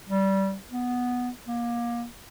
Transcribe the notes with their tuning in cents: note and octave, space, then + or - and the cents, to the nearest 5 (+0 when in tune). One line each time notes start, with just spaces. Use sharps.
G3 -20
B3 -5
A#3 +25